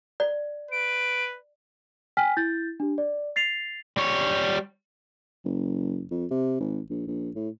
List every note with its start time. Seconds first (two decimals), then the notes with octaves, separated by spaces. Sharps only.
0.20 D5
0.71 B4 D7
2.17 G5 G#5 F6 B6
2.37 E4 G6 A6
2.80 D4 G4
2.98 D5
3.36 A6 C7 F7
3.98 G3 C#5
5.45 F#1
6.11 F2
6.31 C3
6.60 G#1
6.90 A#1
7.07 A#1
7.35 A2